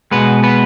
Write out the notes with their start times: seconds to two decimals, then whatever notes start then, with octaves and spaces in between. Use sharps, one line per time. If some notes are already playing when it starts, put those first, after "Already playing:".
0.11 B2 G#3 B3 B4
0.43 B3 B4